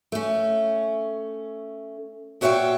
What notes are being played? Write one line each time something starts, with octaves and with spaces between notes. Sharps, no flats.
A3 C#4
A#2 F#4 C#5 E5 F5 G5